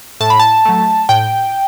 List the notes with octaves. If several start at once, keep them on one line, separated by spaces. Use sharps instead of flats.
A2 A5
B5
A5
F#3 A3
A2 G5